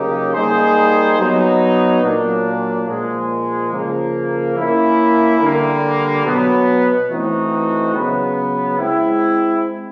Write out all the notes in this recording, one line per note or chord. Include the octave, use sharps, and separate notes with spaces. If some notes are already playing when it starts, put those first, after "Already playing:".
Already playing: C#3 F#3 A#3 D#4 G4
G3 A#3 D#4 G#4 C5
F#3 B3 D#4
A#2 F#3 A#3 D4
A#2 F3 G#3
C#3 F3 A#3
A#3 C#4 E4
D3 G3 A#3
B2 F#3 B3
E3 A3 C4 D#4 F#4
C#3 F#3 B3
G#3 C4 E4